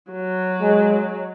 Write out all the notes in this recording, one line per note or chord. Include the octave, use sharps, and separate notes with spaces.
F#3
G#3